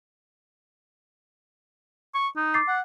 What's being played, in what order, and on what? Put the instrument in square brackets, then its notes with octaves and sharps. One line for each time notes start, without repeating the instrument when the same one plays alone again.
[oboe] C#6
D#4
[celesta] D6 A6 C7
[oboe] F#5